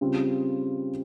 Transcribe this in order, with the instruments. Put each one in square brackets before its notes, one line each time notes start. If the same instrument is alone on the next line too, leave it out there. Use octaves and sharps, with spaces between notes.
[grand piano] C#3 G3 C4 F4